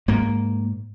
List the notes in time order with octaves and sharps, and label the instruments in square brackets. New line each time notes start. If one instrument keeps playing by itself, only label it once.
[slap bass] G#2 A#3